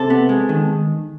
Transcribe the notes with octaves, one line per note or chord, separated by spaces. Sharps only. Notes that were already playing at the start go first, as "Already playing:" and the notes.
Already playing: C3 A4
B3
G#3
D#3